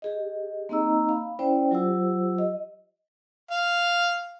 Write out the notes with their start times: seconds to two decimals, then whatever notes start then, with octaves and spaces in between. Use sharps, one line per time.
0.02 G4 G#4 D#5
0.69 A#3 C4 D#4 D#5 A#5 E6
1.09 F5 B5
1.39 C#4 E4 C5 D5 G5
1.71 F#3 F4 G4 C5 E6
2.38 D#5
3.51 F5